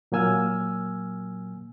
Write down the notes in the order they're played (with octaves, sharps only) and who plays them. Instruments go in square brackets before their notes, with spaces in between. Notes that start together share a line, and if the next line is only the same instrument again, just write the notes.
[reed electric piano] A#2 F#3 A#3 G#5 E6 F6